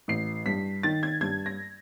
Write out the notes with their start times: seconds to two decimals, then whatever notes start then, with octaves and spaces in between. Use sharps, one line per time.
0.08 A1 C7
0.46 G2 B6
0.83 D#3 A6
1.03 G#6
1.21 G2 G#6
1.46 A#6